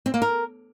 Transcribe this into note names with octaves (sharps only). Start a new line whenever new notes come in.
C4
A#3
A#4